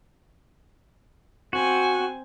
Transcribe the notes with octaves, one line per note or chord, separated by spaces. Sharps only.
C4 F#4 G#5